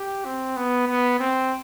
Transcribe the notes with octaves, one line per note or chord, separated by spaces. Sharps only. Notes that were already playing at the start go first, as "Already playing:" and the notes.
Already playing: G4
C4
B3
B3
C4